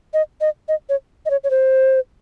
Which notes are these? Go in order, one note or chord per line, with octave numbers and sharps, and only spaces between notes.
D#5
D#5
D#5
C#5
D#5
C#5
C#5
C5